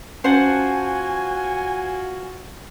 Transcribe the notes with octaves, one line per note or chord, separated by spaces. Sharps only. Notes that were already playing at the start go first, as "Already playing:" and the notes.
C#4 F4 F#4 C5 F#5 G#5 A5